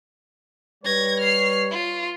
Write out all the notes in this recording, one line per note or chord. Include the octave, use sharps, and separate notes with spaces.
G3 B4 C#5 G#6 A#6
F6 C7
F4